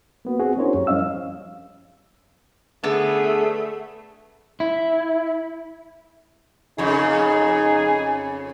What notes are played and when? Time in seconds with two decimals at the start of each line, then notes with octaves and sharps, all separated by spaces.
0.25 A#3 B3 F#4
0.39 C4 F#4 G#4
0.57 C#4 D4 E4 A#4 C5 C#5
0.74 F#2 G4
0.87 F3 G3 C#4 D#5 F5 E6
2.84 D3 A3 B3 G#4
4.60 E4
6.78 F2 C#3 D#4 G#4